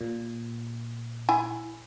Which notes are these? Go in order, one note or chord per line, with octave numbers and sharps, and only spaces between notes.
A#2
E4 G#5